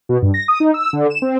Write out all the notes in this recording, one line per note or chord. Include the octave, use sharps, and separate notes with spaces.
B2
G2
A#6
D#6
D#4
E6
D3
E7
C4